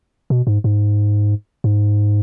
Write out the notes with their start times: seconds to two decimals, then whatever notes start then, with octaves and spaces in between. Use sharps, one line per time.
0.30 B2
0.47 G#2
0.64 G#2
1.64 G#2